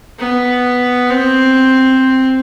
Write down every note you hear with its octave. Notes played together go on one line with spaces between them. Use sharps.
B3
C4